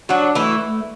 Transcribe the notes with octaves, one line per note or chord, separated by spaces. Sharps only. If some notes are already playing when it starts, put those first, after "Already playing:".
F#3 D4 F#4
E3 A3 E4